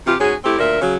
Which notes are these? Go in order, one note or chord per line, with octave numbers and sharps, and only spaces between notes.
C3 E3 F4 G4
G#2 C#4 F#4 G#4
A3 C4 E4 G4
D2 A#2 A#4 E5
C#3 F#3